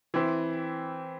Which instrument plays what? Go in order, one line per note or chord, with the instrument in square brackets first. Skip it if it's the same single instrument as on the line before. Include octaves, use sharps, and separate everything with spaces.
[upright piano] E3 C4 E4